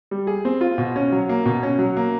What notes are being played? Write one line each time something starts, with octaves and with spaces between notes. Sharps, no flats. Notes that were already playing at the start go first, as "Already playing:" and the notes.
G3
G#4
C4
F4
B2
C#4
F#3
A#3
B2
C#4
F#3
A#3